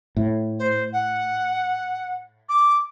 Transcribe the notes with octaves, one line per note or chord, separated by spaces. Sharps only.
A2
C5
F#5
D6